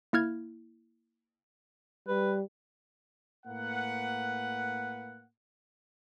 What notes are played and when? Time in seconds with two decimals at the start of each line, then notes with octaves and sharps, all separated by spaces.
0.13 A#3 E4 F6 G#6
2.08 G3 B4
3.46 A2 A#3 B4 F#5